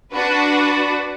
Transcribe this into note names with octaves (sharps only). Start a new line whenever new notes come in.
D4 F#4 B4